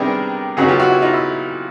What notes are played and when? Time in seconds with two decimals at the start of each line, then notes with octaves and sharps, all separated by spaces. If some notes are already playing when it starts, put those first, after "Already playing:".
Already playing: C3 D#3 G3 B3 D4 G#4 A#4
0.57 C#3 F#3 B3 D#4 F#4 G#4
0.68 F4 G4
0.79 E4 F#4
0.91 E4
1.02 D#4 F4
1.13 E4